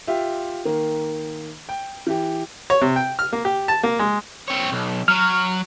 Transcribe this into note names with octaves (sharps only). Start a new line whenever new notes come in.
F4 G4 E5
D#3 A#3
G5
E3 G4
C#5
C3
G5
F6
A#3
G4
A5
A#3
G#3
C4 C#5
B1
F#3 F6